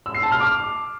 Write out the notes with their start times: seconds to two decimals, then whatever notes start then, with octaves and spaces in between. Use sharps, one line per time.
0.06 E6
0.15 C7
0.23 A5
0.32 F6
0.40 D6